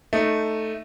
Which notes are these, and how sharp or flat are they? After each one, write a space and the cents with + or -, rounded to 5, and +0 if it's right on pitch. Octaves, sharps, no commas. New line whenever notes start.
A3 +0 D#4 -5